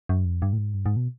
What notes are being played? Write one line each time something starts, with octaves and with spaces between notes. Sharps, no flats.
F#2
F2
G2
A2
G#2
G2
G#2
B2